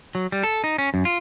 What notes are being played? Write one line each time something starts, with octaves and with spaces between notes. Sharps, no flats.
F#3
G3
A4
D#4
C#4
F#2
F4